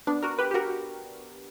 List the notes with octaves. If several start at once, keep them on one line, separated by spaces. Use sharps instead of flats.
B3 D4
F#4 A#4
G4 B4
G4
F#4 A#4